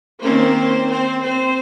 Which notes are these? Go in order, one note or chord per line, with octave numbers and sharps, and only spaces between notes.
D#3 A#3 C4 C#4 C5
C4 C5
C4 C5